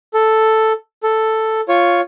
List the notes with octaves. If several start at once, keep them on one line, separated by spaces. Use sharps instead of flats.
A4
A4
F4 C#5